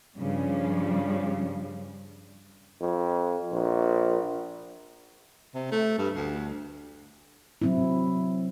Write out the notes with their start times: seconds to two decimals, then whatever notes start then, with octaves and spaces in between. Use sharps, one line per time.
0.18 G2 C#3 F3 G3
2.81 F2
3.52 A#1
5.54 C3
5.72 A3
5.98 G2
6.15 D2
7.62 F#3 C4 E4